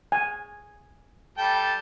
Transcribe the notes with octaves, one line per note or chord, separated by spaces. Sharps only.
G#5
G3 A4 G5